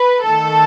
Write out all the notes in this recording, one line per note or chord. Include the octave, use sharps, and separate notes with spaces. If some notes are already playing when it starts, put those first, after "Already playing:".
Already playing: B4
D#3 A3 A4